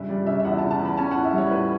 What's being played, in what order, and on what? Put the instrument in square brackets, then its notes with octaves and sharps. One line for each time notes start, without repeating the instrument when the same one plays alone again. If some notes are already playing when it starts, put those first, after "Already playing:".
Already playing: [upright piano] G2 C#3 E5
G3 D5
C#3 E5
E5
E2 F#5
A5
C#3
A5
E2
B5
C#4 A5
A2 F#5
E5
G3 C#5
A2 B4